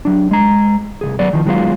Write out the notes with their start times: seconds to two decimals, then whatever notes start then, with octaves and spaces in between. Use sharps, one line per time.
0.05 F#3 D4
0.31 G#3 A#5
1.01 C2 B2 G#4
1.19 F#3 B3 D5
1.33 D#3 F3
1.46 D#3 F#3 G#3 B3 F4